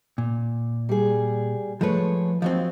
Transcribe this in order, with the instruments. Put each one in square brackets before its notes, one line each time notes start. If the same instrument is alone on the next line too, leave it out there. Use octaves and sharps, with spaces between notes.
[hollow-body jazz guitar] A#2
[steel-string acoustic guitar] G3 G#4
[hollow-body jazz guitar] F3 B4 [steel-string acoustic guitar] G#3 A3 C#5
[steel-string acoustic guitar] D#2 [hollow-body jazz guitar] F3 F#3 C4